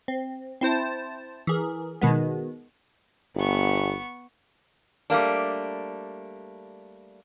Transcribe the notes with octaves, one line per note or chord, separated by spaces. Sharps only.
C4
C4 E4 C5 A5
E3 G#4 A#4
B2 D#3 G#3 B3
G1 B3 C#6
G3 A3 A#3 D4